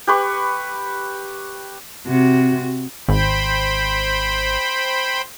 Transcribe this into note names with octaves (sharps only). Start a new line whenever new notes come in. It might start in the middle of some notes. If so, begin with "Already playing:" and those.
G4 B4 C#6
C3 F#4
G#1 C5 G5 B5